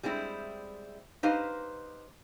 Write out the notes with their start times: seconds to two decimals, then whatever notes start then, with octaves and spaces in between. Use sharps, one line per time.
0.03 G3 G#3 C4 E4
1.23 D#4 G4 B4 C5 D#5 F5